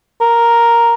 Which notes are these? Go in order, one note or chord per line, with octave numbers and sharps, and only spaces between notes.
A#4